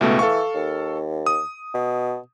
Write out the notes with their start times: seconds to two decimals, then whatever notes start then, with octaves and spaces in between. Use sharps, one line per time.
0.01 C#2 B2 E3 A3
0.19 A4 F5 C#6
0.55 D#2
1.26 D#6
1.74 B2